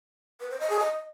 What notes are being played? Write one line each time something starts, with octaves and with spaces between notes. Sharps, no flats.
B4
C5
D#5
G#4
D#5